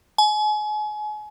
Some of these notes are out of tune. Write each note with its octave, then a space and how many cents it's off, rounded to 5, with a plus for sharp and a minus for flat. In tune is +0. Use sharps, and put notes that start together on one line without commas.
G#5 +35